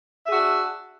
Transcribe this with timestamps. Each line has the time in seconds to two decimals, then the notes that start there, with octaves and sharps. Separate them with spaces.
0.25 E5
0.28 G#4
0.30 F#4
0.33 D4